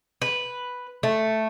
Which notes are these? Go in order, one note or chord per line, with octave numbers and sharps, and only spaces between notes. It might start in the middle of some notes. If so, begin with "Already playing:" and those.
B4
A3